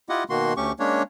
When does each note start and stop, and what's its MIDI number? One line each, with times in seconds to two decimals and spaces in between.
0.09 0.24 64
0.09 0.24 65
0.09 0.24 67
0.09 0.24 75
0.09 0.24 78
0.30 0.53 47
0.30 0.53 51
0.30 0.53 58
0.30 0.53 66
0.30 0.53 84
0.57 0.72 38
0.57 0.72 57
0.57 0.72 61
0.57 0.72 67
0.57 0.72 85
0.79 1.03 56
0.79 1.03 58
0.79 1.03 61
0.79 1.03 62
0.79 1.03 73